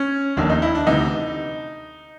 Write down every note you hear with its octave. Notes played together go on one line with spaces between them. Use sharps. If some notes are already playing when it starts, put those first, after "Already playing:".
Already playing: C#4
F1 D#2 D#3 D4
D#4
E4
D4
D2 C3 E3 D#4